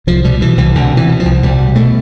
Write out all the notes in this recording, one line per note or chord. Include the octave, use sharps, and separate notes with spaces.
C2 F3
B2 G3
B2 E3
C2 E3
C2 D3
B2 E3
B2
F3
C2
C2 G3
B2
B2 A3